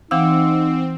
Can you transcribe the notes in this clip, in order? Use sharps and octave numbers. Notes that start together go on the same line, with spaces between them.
E3 C4 D#4 F5 F#5 D6 E6